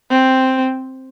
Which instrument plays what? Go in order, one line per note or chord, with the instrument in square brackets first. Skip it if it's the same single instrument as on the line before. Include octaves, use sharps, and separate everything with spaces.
[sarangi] C4